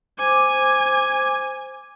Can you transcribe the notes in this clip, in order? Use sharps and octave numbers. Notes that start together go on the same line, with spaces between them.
C5 G#5 D6